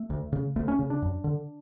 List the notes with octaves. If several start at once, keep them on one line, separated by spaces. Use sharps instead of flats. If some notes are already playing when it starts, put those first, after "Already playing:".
Already playing: A3
D2
C#3
D2 A3
C#4
C#3
D4
F#2
D3